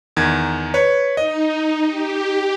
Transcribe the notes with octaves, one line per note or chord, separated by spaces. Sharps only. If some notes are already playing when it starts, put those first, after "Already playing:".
E2 D#3 G#6
B4 C#5
D#4 D#5
G4